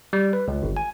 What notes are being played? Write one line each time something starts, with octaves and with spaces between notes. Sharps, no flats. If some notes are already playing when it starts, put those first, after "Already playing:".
G3
B4
C#2
G1
G#5